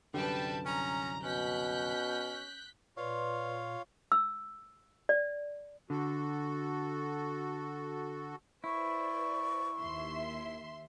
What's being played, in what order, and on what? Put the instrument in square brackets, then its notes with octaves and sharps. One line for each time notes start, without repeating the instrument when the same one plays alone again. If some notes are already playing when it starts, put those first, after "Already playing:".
[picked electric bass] C2 F#2 D3 [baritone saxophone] G3 [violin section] B4 G5 A5
[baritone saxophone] C#4 [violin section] A#5
[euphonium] B2 [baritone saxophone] C#4 [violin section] F#6 G6 B6
[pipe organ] A#2 [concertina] F4 C#5 F5 [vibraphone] B4 D5 C6
[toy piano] E6
D5
[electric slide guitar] D3 [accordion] F#4 A4
[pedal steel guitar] E4 [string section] B4 C5 D5 [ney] C#6
[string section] D#2 E5 C6